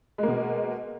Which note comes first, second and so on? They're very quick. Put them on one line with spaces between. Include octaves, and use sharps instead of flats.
G#3 A#3 B2